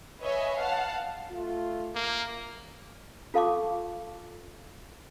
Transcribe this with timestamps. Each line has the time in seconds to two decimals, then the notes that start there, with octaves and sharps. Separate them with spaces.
0.21 B4 C#5 D#5 E5 G#5
0.55 F5 F#5 A5
1.31 A3 F4
1.95 A#3
3.34 F4 A4 F5 A5 C#6 D6